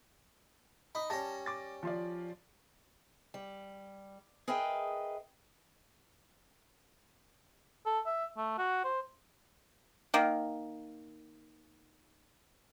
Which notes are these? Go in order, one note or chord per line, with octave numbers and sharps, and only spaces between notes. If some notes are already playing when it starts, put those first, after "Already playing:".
D#4 B5
G3 C#4 A5 A#6
D6 A6
F3 F4 D5
G3
G#4 A#4 B4 D#5 E5 G5
A4
E5
A3
F#4
C5
D#3 A#3